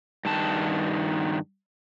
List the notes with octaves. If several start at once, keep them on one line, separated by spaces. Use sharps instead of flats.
G2 D#3 A5